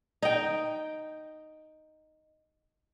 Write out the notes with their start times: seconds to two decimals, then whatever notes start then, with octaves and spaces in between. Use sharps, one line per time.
0.22 D#4 G5